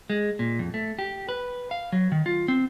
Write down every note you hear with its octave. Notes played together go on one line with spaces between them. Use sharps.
G#3
A#2
F2
A3
G4
B4
F5
F#3
D#3
F4
C4